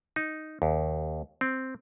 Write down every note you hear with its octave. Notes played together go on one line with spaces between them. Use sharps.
D#4
D#2
C4